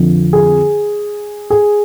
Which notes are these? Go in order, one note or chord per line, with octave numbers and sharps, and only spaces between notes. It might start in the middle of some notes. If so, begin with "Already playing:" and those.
Already playing: F2 D3 F3
G#4
G#4